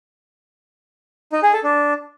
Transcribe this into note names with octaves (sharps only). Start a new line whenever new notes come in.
D#4
G#4
A4
D4